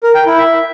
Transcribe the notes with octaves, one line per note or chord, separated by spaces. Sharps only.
A#4
G5
E4
E5